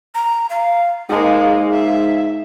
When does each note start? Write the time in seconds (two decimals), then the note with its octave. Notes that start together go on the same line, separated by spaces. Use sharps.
0.15 A#5
0.50 F5
1.10 G#2 G#3 A#3 F5
1.73 E5